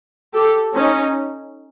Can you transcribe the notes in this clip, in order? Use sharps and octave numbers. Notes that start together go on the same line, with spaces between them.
G4 A4
C#4 D#4